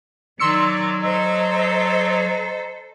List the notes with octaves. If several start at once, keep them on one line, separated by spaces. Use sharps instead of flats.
D#3 F#3 D5 C6 E6 C#7
A4 C5 D#5 A#5